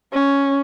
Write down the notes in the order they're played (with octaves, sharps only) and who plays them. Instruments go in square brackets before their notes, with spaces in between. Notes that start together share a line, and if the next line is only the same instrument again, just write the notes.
[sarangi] C#4